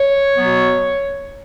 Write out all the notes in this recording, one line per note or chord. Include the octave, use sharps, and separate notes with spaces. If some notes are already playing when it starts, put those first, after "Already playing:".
Already playing: C#5
B2 F#3 B3